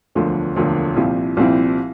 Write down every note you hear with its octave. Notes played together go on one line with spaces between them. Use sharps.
E1 D2 D3 F3 A#3
E1 D2 D3 F3 A#3
C2 A#2 F3 C4 E4
C2 A#2 F3 C4 E4